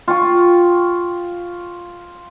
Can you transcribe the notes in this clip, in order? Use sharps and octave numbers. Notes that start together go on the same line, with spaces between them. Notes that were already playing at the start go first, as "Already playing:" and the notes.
F4 G5 C#6